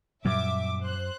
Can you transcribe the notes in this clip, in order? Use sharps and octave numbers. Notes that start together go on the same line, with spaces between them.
F#2 A#2 F#3 G3 E5 D6
C5 F#6